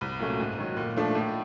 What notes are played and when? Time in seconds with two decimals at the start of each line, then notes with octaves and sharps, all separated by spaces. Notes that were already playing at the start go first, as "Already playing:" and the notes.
0.01 C2
0.19 A#2 F#3 A3 C#4
0.40 G#2
0.58 D#3 F#3
0.77 A#2
0.97 F3 A3 D4
1.15 A2